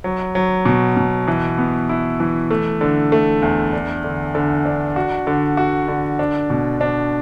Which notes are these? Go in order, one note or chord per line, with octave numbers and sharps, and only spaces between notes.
F#3
F#3
B2
B2
E3
B3
E4
E3
A3
D3
A3
E2
D4
D3
D3
D4
F#4
D3
F#4
D3
D4
B2
D4